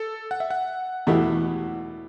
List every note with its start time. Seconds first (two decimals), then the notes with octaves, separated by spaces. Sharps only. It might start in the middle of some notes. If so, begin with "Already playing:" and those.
Already playing: A4
0.31 F#5
0.40 E5
0.51 F#5
1.07 E2 B2 A3 E4 G4